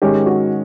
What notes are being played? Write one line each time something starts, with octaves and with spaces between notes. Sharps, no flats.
G#2 D#3 G#3 C#4 G4
F#4